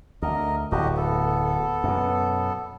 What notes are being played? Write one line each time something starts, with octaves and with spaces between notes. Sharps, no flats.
D2 A#4 D#5
D1 A2 F#4 G4 D#5
B3 A4
F#2 B2